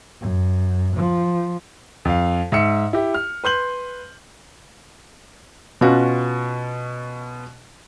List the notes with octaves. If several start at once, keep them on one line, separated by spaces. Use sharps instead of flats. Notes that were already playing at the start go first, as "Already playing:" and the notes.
F#2
F3
F2 F5
G#2 E5 E6 C#7
E4 G4
F6
B4 C6 G6 F#7
B2 C#4 F4 F#4